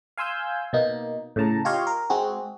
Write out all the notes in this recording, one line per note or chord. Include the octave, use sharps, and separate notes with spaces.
F5 G#5 C6 E6 G6
B2 A#3 D#4
A2 C#3 A5 A#5
F4 G4 C#5 D#5 F5 C6
A#4
G#3 C4 F#4 G#4